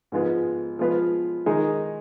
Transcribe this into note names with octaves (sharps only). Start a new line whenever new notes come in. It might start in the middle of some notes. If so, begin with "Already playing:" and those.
G#2 F3 G#3 B3 F4
F3 G#3 B3 F4 B4
D#3 G#3 D#4 G#4